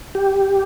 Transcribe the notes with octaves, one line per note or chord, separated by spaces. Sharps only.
G4